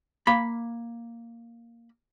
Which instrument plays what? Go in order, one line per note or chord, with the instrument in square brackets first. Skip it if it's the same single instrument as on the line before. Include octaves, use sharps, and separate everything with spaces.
[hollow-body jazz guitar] A#3 B5